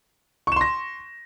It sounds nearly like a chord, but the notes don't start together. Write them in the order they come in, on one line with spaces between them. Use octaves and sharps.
C#6 E7 C6 A#6